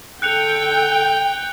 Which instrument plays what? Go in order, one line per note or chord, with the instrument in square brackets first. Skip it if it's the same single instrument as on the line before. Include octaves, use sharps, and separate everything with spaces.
[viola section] D3 A4 [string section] G5 [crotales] F#6 C#7 F7